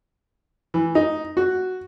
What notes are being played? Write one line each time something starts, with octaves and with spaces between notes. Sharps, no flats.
E3
D#4
F#4